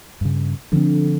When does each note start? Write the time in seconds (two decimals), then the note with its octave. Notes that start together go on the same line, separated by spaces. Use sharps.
0.21 G2 C#3
0.72 D3 F3 C4